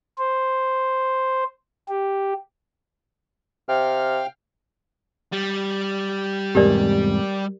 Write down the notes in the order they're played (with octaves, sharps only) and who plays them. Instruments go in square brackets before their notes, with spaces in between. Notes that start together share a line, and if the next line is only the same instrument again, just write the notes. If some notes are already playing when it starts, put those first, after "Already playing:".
[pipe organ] C5
G4
[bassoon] C3 [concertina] F5 G5 F6
[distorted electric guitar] G3
[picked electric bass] E2 G#2 C3 [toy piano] G4 A#4 D5